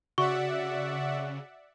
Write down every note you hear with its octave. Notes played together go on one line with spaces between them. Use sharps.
C#3 F#4 D5 E5 F#5 C#6